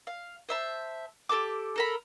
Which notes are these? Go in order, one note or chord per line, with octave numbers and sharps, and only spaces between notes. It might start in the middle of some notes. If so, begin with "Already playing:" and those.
F5
C5 E5 A5
G4 A4 A5 D6
A4 A#4 B5